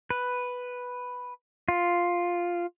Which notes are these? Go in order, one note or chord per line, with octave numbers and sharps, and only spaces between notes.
B4
F4